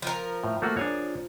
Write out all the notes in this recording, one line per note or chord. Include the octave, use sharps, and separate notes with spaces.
F3 A#4
A2
A3 A#3 F#4
D4 G#4 C#5